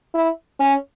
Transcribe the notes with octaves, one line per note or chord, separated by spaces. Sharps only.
E4
C#4